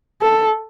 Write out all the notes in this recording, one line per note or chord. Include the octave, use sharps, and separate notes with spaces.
A4